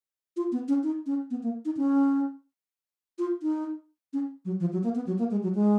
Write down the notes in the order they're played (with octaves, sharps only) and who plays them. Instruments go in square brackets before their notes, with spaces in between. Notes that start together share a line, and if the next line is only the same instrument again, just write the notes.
[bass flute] F4
B3
C#4
D#4
C#4
B3
A#3
D#4
C#4
F4
D#4
C#4
F#3
F3
F#3
A#3
B3
F#3
A#3
G#3
F#3
G#3